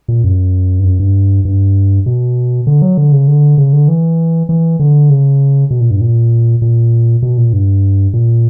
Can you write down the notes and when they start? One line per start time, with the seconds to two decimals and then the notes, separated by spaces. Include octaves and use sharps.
0.08 A#2
0.24 F#2
0.80 G2
0.84 F#2
0.99 G2
1.45 G2
2.06 B2
2.67 D3
2.82 F#3
2.97 D3
3.12 C#3
3.28 D3
3.58 C#3
3.73 D3
3.88 E3
4.49 E3
4.79 D3
5.10 C#3
5.71 B2
5.81 A#2
5.91 G2
6.01 A#2
6.62 A#2
7.22 B2
7.37 A#2
7.53 G2
8.14 A#2